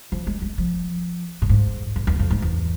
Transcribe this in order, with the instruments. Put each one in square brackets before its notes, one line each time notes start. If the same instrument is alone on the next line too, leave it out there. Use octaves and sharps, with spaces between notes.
[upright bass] F3
G#3
G#3
F3
A2
G#2
F2
E2
F2
G#2
E2